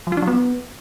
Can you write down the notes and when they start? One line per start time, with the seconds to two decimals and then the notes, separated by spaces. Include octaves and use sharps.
0.07 F3
0.12 F4
0.17 D4
0.22 F#3
0.27 B3